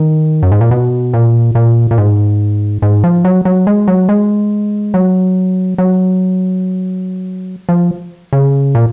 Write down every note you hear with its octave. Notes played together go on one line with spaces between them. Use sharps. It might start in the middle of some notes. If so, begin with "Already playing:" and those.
Already playing: D#3
F#2
G#2
A#2
B2
A#2
A#2
A#2
G#2
G#2
F3
F#3
F#3
G#3
F#3
G#3
F#3
F#3
F3
C#3
A#2